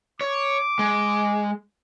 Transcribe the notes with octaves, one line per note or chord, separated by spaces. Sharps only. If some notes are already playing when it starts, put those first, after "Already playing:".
C#5 D6
G#3